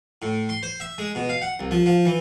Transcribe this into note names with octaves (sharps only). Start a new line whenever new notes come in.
A2
C6
C5
E5
G#3
B2
F5
F#5
C2
F3
F3
E3